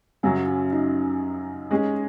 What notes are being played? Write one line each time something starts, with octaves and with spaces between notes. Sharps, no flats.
F#2 C#3 F#3 C#4
C#4
D#4
G#3 C#4 G#4